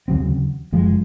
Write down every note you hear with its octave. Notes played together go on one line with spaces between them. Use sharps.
D#2 C#3 F#3 C4
F#1 F#2 F3 G#3